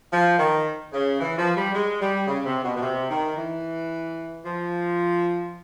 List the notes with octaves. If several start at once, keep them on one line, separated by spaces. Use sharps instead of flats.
F3
D#3
C#3
E3
F3
G3
G#3
G3
C#3
C3
B2
B2
C3
D#3
E3
F3